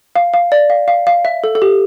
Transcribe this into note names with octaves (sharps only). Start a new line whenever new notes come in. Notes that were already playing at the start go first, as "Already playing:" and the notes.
F5
F5
D5
F5
F5
F5
E5
A4
A4
G4